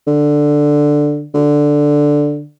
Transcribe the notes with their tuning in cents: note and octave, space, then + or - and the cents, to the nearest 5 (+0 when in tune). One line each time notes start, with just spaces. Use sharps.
D3 +5
D3 +0